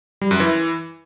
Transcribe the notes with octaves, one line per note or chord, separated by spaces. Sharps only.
G3
F#2
E3